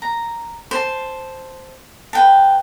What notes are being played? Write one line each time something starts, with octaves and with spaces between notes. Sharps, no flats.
A#5
C5 A5
B4 G5 A5